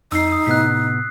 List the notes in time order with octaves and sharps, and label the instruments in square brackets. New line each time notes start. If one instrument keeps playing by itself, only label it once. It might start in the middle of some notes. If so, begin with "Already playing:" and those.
[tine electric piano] F2 [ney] D#4 [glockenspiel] E6 C7
[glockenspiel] D#6
[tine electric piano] A2 C3 B3 [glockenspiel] F#6 B6